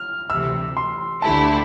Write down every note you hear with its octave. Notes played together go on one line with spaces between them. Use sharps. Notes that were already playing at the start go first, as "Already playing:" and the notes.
Already playing: F6
D2 C3 E3 E6
C6
D2 D3 A3 E4 G4 A5